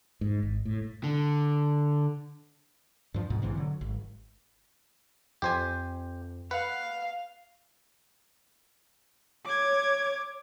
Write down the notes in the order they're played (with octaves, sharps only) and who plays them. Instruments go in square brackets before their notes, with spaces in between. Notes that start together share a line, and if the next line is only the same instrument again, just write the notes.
[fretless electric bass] G#2
G#1
A2
[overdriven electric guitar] D3
[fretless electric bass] G2 F3
D2 G#2 B2
A#1 G#2 C3 E3
D3 F#3
G#1
[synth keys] F2 [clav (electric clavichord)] G4 C5 G#5
[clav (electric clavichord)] B4 [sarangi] F5 [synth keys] F#5
[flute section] C#5 [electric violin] D6 G#6